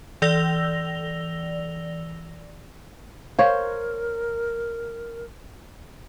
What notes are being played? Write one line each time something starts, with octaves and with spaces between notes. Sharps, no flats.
E3 D5 E6 A#6 F7 G7
A#4 C5 C#5 F5